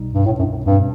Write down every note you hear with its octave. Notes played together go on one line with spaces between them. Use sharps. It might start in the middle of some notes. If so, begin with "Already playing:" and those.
Already playing: C2 B2 G3 D#4
G2
A2
F#2
E2 G2 B2 G3 C4